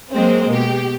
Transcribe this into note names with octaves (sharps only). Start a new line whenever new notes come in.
F#3 G#3 A#3 C4
B2 G4